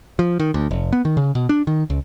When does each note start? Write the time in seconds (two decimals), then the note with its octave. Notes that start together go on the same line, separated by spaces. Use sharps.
0.19 F3
0.40 D#3
0.54 D2
0.71 F1
0.93 B3
1.05 D#3
1.17 C#3
1.35 B2
1.49 D4
1.67 D#3
1.90 C#2